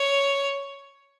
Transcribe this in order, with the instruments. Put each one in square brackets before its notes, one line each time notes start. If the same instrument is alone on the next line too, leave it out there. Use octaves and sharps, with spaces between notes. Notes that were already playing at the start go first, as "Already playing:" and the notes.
Already playing: [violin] C#5